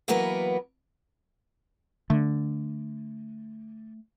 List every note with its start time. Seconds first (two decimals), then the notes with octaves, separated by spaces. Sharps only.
0.08 E3 F#3 A#3 B3 A#4 B4
2.10 D3 A3